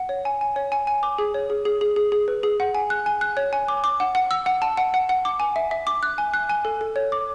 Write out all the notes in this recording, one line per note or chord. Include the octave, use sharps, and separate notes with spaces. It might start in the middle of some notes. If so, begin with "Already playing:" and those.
Already playing: F#5
C#5
G#5
G#5
C#5
G#5
G#5
D6
G#4
C#5
G#4
G#4
G#4
G#4
G#4
B4
G#4
F#5
G#5
F#6
G#5
F#6
C#5
G#5
D6
D6
F#5
F#5
E6
F#5
A5
F#5
F#5
F#5
D6
G#5
E5
E5
D6
F#6
G#5
F#6
G#5
A4
A4
C#5
D6